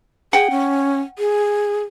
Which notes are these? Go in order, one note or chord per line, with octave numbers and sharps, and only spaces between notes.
G#4 F#5 G5
C#4
G#4